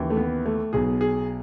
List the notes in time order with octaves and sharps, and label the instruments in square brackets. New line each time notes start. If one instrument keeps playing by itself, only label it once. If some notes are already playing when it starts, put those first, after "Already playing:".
Already playing: [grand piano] D#2 C#3 E3
A3
B3
A3
B1 B2 G#4
G#4